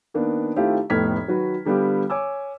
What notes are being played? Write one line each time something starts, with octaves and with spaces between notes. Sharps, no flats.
D#3 A#3 B3 D4
D#3 A3 C4 E4 F4 G4
F1 A2 B3 F6 G#6 B6
D#3 F#3 F#4 B4
D3 G3 B3 F4 G4
C#5 G#5 D6 E6